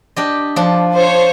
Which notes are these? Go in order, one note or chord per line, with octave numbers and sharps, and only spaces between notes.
D4 G4 D#5
F3 D4
C5 C#5